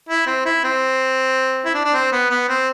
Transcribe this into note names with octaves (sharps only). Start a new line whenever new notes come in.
E4
C4
E4
C4
E4
D4
D4
C4
B3
B3
C4